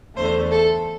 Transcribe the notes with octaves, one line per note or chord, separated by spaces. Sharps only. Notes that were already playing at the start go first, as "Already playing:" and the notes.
E2 D3 A3 C5
A4